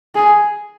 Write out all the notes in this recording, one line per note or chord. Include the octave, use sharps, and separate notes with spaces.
G#4